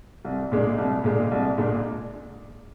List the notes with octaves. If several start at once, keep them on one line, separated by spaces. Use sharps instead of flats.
C2
A#2 G#3 D4
C2
A#2 G#3 D4
C2
A#2 G#3 D4